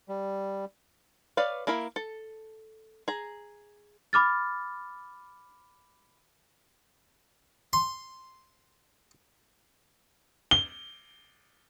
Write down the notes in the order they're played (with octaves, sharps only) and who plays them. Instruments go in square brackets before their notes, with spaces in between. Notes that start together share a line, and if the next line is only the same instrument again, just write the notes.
[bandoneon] G3
[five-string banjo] B4 C#5 D5 F5
A#3 E4 A#4 B5
A4
G#4 A#5
[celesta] B5 D6 F6 A6
[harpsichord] C6
[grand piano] G7